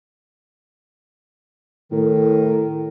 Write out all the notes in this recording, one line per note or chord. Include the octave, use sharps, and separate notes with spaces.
A2 D#3